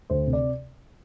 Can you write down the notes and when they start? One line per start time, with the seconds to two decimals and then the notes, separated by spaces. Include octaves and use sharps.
0.10 D2 C5
0.27 C3
0.33 D5